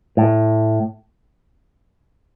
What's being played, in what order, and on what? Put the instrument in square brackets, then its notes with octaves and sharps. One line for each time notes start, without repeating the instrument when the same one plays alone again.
[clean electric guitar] A2